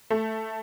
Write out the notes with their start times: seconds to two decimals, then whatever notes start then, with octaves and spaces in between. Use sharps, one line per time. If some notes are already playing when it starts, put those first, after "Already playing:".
0.11 A3